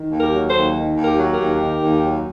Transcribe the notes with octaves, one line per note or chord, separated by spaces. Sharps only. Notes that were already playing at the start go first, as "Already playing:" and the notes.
Already playing: D#3
D#2
G4 A#4
F#3
A4 C5
D#2
D#3
D#2
G4 A#4
F#3
G4 A#4
D#2
D#3
D#2
F#3